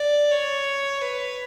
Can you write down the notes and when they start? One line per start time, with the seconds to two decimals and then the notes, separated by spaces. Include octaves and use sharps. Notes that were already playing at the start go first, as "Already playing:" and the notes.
Already playing: D5
0.31 C#5
1.01 B4